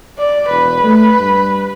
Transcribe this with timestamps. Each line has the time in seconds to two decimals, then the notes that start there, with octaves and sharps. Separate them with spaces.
0.18 D5
0.50 E1 B4
0.84 A3
1.18 G2